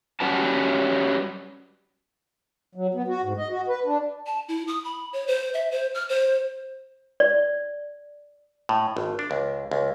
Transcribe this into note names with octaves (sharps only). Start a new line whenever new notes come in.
F#3 G3 C#4 F#4 B4 A5
F#3
B3
F#4
G#2
D#5
F#4
B4
D4
A5
E4
D#6
B5
C#5
C5
E5
C5
F6
C5
D5
A2
G#1
D4
C#2
C#2